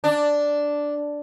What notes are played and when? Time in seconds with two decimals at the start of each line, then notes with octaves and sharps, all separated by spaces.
0.04 D4